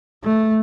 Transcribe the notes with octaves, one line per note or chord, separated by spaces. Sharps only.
A3